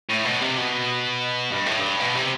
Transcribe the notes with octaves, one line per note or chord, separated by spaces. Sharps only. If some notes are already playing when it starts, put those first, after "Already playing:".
A2
B2
C3
B2
G2
A2
G2
B2
C3